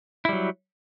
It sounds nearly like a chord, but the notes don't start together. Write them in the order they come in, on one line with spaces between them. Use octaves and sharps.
E4 G3 F#3